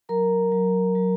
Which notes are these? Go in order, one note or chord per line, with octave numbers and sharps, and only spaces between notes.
F#3 A#4 A#5
F#3
F#3